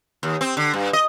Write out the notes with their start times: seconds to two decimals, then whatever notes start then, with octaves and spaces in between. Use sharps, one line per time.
0.23 D#2
0.41 C4
0.57 D3
0.74 G2
0.93 D#5